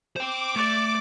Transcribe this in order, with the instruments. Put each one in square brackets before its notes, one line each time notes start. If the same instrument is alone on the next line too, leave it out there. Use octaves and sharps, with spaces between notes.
[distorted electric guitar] C5 G5 [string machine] D6
[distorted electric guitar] A3 [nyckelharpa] D5